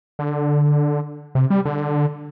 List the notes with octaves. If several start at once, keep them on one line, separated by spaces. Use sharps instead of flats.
D3
C3
G3
D3